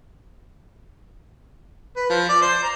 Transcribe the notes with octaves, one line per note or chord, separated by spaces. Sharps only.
B4
F3
D5
C5
A#5